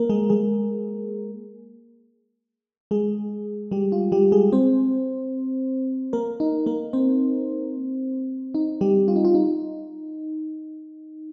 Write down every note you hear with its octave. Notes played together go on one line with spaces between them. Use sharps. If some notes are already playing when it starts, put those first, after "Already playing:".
Already playing: A#3 A#4
G#3 G#4
G#3 G#4
G#3 G#4
G3 G4
F4
G3 G4
G#3 G#4
C4 C5
A#3 A#4
D#4
A#3 A#4
C4 C5
D#4
G3 G4
F4
D#4
F4
D#4